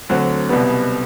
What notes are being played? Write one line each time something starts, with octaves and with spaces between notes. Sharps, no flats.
D2 D3 F#3 C4 F#4
C2 B2 G3 B3